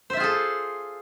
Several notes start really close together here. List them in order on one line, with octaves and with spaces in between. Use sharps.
C5 E5 F4 G#4 A4